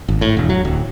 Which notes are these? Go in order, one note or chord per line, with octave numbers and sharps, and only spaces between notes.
G#1
A2
E1
F#3
D1